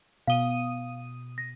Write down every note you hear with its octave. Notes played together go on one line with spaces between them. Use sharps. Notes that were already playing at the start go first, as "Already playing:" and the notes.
B2 F5 D#6 D#7 G7
A#6